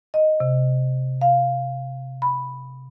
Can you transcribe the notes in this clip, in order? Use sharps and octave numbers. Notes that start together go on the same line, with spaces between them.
D#5
C3
F5
B5